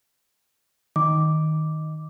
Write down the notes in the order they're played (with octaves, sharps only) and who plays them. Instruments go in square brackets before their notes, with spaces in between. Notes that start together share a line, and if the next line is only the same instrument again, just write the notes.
[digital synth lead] D#3 [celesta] D6